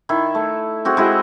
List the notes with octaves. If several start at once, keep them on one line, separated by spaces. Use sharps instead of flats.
D#3 E4
A3
C4 F#4 G#4
G#3 E4 F#4